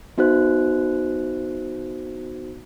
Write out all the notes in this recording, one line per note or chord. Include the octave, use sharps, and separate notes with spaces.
B3 D#4 F#4 C5 F#6